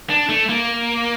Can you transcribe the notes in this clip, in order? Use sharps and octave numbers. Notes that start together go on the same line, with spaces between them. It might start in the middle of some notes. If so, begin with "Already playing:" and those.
D4
A3
A#3